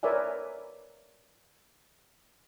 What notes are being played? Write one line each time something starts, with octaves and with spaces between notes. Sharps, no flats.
A#4 B4 C#5 D5 E5 G#5